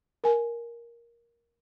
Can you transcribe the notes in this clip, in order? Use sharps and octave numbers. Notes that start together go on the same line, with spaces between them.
A#4 G#5